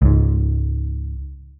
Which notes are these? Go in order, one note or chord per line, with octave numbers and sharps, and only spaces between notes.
C#2 G#2